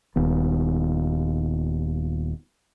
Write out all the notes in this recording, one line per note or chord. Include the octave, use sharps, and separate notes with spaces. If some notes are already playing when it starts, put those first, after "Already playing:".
D#1 D#2 B3